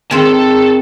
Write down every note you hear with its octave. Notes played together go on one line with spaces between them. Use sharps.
D#3 C4 G#4 A4 A5